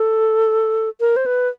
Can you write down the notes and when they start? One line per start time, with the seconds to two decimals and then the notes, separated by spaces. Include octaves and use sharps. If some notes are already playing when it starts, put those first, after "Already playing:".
Already playing: A4
1.00 A#4
1.16 C5
1.26 B4